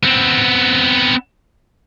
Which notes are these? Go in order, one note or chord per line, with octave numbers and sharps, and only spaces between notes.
B3 C4